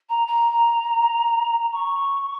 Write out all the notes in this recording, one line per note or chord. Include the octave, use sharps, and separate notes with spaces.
A#5
A#5
C#6